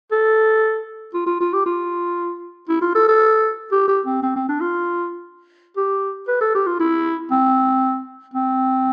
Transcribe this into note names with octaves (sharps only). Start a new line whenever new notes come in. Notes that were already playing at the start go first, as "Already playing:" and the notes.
A4
F4
F4
F4
G4
F4
E4
F4
A4
A4
G4
G4
C4
C4
C4
D4
F4
G4
B4
A4
G4
F4
E4
C4
C4